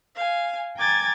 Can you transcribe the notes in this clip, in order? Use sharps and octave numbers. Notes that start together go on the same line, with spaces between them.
F5 G#5
G5 G#5 A#5 D6 G#6 A6